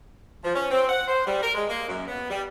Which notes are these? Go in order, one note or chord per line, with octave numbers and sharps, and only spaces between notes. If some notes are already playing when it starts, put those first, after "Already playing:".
F3
C#4
C4
F#5
C5
G3
A#4
G#3
A#3
F#2
B3
G3